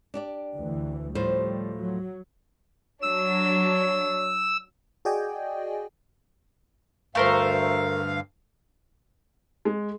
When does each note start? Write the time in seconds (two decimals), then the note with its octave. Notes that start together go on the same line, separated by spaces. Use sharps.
0.14 D4 G4 D5
0.54 D2 E3
1.15 A2 F3 G3 C5
1.78 F#3
3.02 F#3 D4 C#5 E6
5.05 F#4 G#4 D5 D#5 G5 G#5
7.15 D2 G2 A3 A#4 C5 F5
9.65 G#3